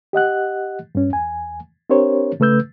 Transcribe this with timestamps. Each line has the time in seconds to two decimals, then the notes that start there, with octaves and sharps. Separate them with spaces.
0.13 G4 D#5 F#5 F#6
0.95 G2 C#4
1.10 E2 G#5
1.90 C4 D4 G4 A#4 C5 C#5
2.40 C#3 A3 B4 E6 G6